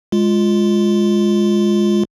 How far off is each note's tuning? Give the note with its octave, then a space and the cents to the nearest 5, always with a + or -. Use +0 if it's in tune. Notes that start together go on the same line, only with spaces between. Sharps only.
G#3 -5 F4 +0